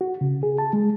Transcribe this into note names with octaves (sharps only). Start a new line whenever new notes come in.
F#4
C#3
G#4
A5
G#3